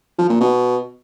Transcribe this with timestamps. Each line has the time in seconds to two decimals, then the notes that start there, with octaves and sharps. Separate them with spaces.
0.18 F3
0.30 A#2
0.41 B2